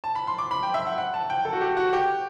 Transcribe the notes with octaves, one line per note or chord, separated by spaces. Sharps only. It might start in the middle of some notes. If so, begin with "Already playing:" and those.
A5
B5
C6
D6
B5
G5
E5
F#5
F#5
A5
G5
A4
F#4
G4
F#4
G4